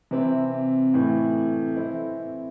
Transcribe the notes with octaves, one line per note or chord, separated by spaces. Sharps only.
C3 E3 C4 E4
A2 E3 A3 E4
E3 C4 E4